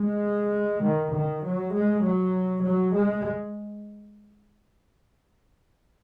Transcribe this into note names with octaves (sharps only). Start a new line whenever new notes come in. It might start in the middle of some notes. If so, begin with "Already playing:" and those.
Already playing: G#3
D#3
D#3
F#3
G#3
F#3
F#3
G#3